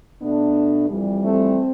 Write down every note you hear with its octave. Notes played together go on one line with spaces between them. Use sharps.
B2 A3 B3 D4
F2 E3 G3
A3 C4